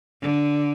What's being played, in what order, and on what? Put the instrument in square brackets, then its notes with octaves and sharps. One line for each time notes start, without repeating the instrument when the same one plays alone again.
[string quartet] D3